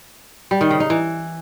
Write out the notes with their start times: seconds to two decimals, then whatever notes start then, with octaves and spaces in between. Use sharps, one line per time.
0.51 G3
0.61 D#3
0.70 C#3
0.80 D#4
0.90 E3